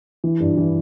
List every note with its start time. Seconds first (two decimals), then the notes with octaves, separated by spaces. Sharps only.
0.24 E3
0.40 G2
0.58 E3